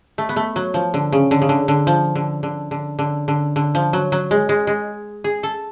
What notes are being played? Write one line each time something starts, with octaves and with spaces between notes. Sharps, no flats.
A3
B3
A3
F#3
F3
D3
C#3
D3
C#3
D3
D3
F3
D3
D3
D3
D3
D3
D3
F3
F#3
F#3
G#3
G#3
G#3
G#4
A4